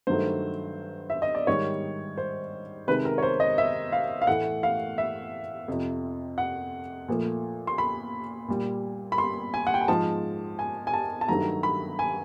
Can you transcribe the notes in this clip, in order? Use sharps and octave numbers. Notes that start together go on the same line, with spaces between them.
G2 D#3 F#3 A3 C5
E5
D#5
D5
G#2 D#3 G3 C#5
C5
C3 D#3 G#3 B4
A#4
C#5
C5
D#5
E5
F5
F5
A2 E3 A3 F#5
F5
E5
F2 C3 F3
F#5
A#2 F3 A3
C6
B5
A#2 G3
B5
C6
G#5
F#5
G5
G#5
G#2 F3 G#3 A5
G#5
G#5
A5
A5
G2 D#3 F#3 A3 A#5
B5
G#5